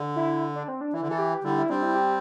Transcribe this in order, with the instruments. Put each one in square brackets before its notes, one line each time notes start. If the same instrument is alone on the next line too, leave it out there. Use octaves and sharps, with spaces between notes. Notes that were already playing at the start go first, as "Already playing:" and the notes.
Already playing: [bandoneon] D3
[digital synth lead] E4
D4
C4
D4
[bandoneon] E3 [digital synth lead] E4
[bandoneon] D3
[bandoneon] E3 [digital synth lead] A4
[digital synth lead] G4
[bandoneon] D3 G3 [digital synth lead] E4
[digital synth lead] E4
[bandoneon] G3 C4 [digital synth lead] D4
[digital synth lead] E4
G4